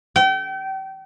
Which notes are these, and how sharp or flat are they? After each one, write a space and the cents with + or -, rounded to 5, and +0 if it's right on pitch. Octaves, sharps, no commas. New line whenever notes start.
G5 -35